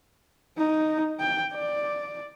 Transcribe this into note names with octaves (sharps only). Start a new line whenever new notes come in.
D#4
G5
D5